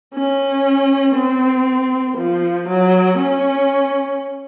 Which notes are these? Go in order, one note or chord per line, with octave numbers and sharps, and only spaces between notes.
C#4
C4
F3
F#3
C#4